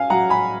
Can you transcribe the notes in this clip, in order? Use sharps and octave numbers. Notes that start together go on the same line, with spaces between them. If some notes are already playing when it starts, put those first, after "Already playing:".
Already playing: C#4 F5 G#5
F#3 F#5 A#5
G#5 B5